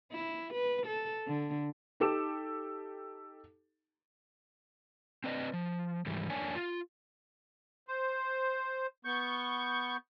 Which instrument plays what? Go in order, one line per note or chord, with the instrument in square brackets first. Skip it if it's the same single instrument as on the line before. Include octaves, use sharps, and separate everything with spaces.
[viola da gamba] E4
B4
A4
D3
[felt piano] D#4 G4 A4 D6 E7
[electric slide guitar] C4 B4 D5 D#5
F3
G#2 E3 G3
F2 A#3 D4 C#5 G#5
F4
[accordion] C5
B3 C#6 G6